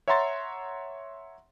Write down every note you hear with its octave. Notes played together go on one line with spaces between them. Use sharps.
C#5 E5 F#5 A#5 C6 A6